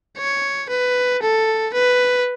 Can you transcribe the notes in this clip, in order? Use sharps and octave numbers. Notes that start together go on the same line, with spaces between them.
C#5
B4
A4
B4